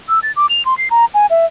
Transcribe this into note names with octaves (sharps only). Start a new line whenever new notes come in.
E6
A6
D6
F7
C6
C7
A#5
G#5
E5